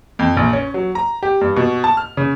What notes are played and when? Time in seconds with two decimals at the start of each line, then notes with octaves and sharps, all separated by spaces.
0.19 F2
0.37 A#1
0.53 C#4
0.74 F#3
0.95 A#5
1.23 G4
1.41 G2
1.56 B2
1.84 A5
1.97 F6
2.17 C#3